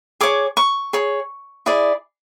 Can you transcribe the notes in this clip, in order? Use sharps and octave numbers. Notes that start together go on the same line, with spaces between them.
G#4 C#5 D6
C#6
G#4 C#5
E4 G#4 D5